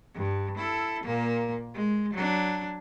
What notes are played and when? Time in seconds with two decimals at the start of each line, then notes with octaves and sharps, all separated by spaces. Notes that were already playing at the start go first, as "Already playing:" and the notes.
0.14 G2
0.58 E4 A4
1.04 A#2 A#3
1.74 G#3
2.13 F#3 D4